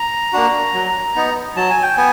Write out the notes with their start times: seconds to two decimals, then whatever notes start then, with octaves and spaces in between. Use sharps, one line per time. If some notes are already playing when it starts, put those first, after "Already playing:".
Already playing: A#5
0.33 A#3 D4 F#4
0.74 F#3
1.15 B3 D#4
1.56 F#3 A5
1.70 G#5
1.83 G5
1.97 B3 G#5